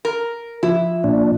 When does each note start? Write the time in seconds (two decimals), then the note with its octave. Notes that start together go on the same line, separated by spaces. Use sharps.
0.05 A#4
0.63 F3 E4 F4
1.04 A#2 D4